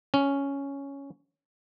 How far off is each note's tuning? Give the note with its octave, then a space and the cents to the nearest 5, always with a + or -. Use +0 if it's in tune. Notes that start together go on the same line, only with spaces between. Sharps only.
C#4 +5